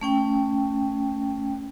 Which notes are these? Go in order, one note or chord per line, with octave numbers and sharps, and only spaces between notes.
A3 C#4 G5